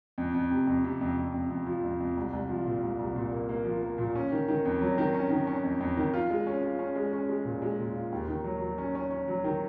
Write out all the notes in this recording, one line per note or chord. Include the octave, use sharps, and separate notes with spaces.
F2
F2
C3
F2
C3
F2
F2
F2
F2
F3
F2
F2
C2
C2
F3
A#2
C2
C2
A#2
A#3
A#3
F3
A#3
A#2
C#4
D#3
D#3
F2
F#3
D#3
C#4
D#3
C#4
F2
F2
D#3
F4
G#3
C#4
F4
C#4
G#3
C#4
G#3
A#2
G#3
A#2
F4
D#2
D#3
F#3
F#3
C#4
C#4
C#4
F#3
D#3